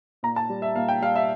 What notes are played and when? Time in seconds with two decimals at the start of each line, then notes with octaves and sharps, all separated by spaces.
0.23 A#2 A#5
0.36 A5
0.50 G3
0.62 E5
0.76 A#2 F5
0.89 G5
1.02 G3 F5
1.16 E5